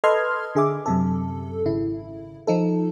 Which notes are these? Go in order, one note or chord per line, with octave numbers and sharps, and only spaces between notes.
A4 B4 D#5 C6 F6 G#6
D3 G#4 E5 D6
F#2 C3 A4
G#1 C#3 E4
F3 D#4 A4